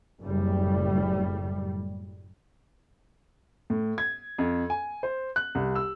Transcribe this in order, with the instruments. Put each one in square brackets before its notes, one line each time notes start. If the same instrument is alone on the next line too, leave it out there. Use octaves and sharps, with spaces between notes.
[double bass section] F#1 A2 G3
[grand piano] A2
G#6
F2
G#5
C5
F#6
C2
E6